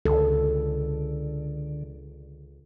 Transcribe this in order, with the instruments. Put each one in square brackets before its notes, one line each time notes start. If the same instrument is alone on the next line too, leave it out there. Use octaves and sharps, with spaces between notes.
[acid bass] C#2 [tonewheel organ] D3 [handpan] A4